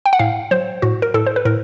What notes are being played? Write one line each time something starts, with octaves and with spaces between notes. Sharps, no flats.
G5
F#5
A2 F5
F#3 C5
A2 F#4
A#4
A2 A4
C5
B4
A2 A#4